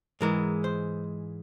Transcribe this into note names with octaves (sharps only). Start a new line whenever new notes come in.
G#2 E3 G#3 A#4
C5